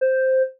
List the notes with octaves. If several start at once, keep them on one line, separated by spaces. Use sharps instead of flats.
C5